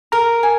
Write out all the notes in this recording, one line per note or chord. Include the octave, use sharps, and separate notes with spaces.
A#4 A#5
G#5